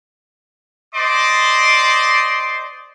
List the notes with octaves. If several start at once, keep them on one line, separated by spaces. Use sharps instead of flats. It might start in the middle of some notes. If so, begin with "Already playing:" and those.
C5 D5 D#5 C6 D6